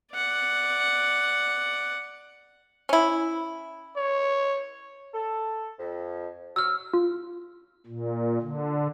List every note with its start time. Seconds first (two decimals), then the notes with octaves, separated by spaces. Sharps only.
0.14 D5 F#5
2.89 C#4 E4
3.97 C#5
5.14 A4
5.79 F2
6.56 F#3 C#5 E6 F6
6.94 F4
7.87 A#2
8.41 D3